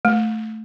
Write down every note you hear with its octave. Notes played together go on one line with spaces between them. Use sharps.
A3